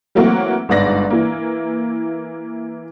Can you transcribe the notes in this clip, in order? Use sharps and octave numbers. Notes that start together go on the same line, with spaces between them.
E3 F#3 A3 A#3 C4 F#4
G1 G#2 D5 A#6
E3 A#3